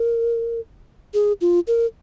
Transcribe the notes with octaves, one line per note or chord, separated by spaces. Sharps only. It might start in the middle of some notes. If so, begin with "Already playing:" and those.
Already playing: A#4
G#4
F4
A#4